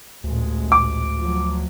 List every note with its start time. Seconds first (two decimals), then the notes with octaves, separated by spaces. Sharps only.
0.24 A1 D2 A#2 G#3
0.72 D6
1.19 F3 F#3